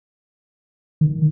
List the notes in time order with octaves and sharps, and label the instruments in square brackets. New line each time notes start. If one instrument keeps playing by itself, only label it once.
[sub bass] D#3